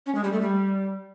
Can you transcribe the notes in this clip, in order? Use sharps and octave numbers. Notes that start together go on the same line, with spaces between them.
C#4
G#3
G3
A3
G3